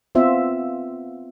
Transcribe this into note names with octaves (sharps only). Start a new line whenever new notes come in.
B3 C4 F4 E5